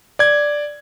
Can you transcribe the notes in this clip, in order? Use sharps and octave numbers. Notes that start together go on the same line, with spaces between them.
D5 G#6